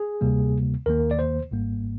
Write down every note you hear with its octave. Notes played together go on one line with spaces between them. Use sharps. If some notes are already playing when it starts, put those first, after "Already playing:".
Already playing: G#4
D2 C3 G3 A#3
D#2 D#3 A#3 A#4
D5
C5
G#1 G#2 G3 A#3